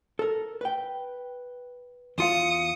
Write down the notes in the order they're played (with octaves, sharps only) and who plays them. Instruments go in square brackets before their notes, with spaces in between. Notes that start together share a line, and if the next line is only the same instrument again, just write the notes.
[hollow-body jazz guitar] A4 A#4
B4 G5
[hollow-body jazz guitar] E2 F4 F5 [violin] D#6 C#7